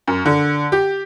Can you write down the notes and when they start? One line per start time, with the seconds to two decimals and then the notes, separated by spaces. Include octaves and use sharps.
0.08 F#2
0.25 D3
0.72 G4